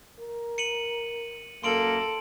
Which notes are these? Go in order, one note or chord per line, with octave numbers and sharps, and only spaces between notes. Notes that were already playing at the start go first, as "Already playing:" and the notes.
A#4
C#7 D#7 F#7
F#2 A#3 A4 C6 D7 F#7